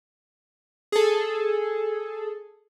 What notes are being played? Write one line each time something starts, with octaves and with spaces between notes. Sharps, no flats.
G#4 A4